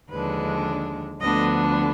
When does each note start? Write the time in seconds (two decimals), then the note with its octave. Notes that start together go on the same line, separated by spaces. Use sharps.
0.11 D#2 D3 F3 G#3 D4 B4
1.21 D2 D3 F3 B3 D4 D#5